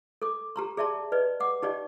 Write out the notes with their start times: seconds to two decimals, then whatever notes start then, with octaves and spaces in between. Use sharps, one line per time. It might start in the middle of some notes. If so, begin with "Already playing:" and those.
0.22 A4 D6
0.56 G4 A#5 C6
0.77 G#4 D5 E5 A5 C6
1.12 B4 D5 D#5
1.40 F#5 D6
1.62 D#4 G4 D5 D#5